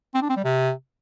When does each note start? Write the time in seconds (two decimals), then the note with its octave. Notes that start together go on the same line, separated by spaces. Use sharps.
0.14 C4
0.22 D4
0.29 C4
0.37 G3
0.44 C3